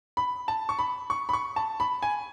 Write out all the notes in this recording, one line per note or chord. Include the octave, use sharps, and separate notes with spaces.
B5
A5
C#6
B5
C#6
B5
C#6
A5
B5
G#5